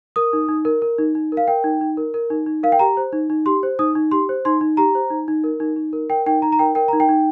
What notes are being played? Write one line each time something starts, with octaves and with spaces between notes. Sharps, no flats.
A#4 D#6
D#4
D#4
A#4
A#4
D#4
D#4
A#4
F5
A#4 G5
D#4
D#4
A#4
A#4
D#4
D#4
A#4 F5
G5
G4 A#5
C5
D#4
D#4
G4 C6
C5
D#4 D#6
D#4
G4 C6
C5
D#4 C6
D#4
G4 A#5
C5
D#4
D#4
A#4
D#4
D#4
A#4
A#4 G5
D#4 G5
D#4 A#5
A#5
A#4 G5
A#4 G5
D#4 A#5
G5
D#4